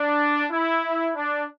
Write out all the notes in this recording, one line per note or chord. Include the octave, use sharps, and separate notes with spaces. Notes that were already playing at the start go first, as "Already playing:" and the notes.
Already playing: D4
E4
D4